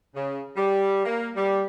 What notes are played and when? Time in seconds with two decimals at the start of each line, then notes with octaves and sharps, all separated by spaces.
0.15 C#3
0.57 G3
1.05 A#3
1.36 G3